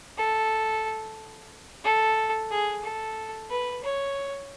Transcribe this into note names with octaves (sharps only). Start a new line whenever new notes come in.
A4
A4
G#4
A4
B4
C#5